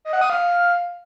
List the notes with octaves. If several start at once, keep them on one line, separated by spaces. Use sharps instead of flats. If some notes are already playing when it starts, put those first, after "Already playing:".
D#5
F#5
D#6
F5